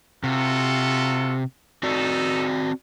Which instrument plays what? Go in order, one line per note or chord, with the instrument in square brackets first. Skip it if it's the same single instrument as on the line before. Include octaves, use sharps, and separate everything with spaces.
[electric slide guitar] C3 [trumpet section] F4 F#4 A4
[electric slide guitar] C4 F#4 D5 [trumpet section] D#4 A4